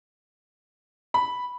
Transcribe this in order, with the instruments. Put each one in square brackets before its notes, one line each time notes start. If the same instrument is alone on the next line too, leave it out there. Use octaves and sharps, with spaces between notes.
[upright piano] B5